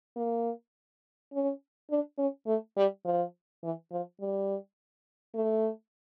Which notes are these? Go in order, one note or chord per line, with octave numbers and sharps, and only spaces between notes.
A#3
C#4
D4
C#4
A3
G3
F3
E3
F3
G3
A3